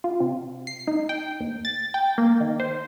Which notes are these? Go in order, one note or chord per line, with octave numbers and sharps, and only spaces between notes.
F4
C3
C7
D#4
G5
D#2
A6
G5
A#3
D#3
C5